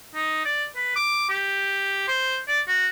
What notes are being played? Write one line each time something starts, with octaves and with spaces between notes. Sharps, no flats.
D#4
D5
B4
D6
G4
C5
D5
F#4